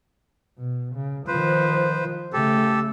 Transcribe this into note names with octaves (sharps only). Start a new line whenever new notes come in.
B2
C#3
D#3 F3 B4 C5
C#3 A3 G4 A4